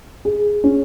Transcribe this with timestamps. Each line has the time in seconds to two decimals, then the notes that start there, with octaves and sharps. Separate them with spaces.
0.25 G#4
0.64 C#4